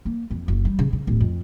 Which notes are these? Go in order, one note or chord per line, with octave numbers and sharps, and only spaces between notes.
A#3
F2
F#1
G3
C#3
C#3
D1
F2